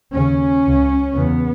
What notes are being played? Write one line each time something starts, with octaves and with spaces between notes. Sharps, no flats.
D#2 C#3 C#4
C#2 C#3
E2 C#3 B3